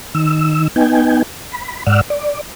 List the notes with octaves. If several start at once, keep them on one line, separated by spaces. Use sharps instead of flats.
D#3 E6
B3 D#4 G5 G#5
B5
G#2 D5 F#5 E6 F6
D5